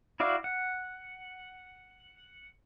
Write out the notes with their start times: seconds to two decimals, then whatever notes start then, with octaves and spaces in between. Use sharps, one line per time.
0.20 E4 F#4 D5 F5
0.44 F#5